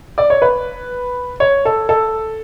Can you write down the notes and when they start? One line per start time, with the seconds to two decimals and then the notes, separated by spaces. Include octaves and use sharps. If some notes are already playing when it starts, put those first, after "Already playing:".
0.18 D5
0.30 C#5
0.42 B4
1.40 C#5
1.65 A4
1.89 A4